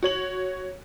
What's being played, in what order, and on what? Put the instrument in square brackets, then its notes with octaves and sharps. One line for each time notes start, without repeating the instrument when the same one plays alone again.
[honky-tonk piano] F#4 C#5 F#7